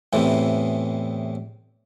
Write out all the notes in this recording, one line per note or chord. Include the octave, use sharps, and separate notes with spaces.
E2 A2 C3 E3